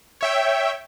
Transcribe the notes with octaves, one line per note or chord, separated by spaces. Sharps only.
C#5 E5 G5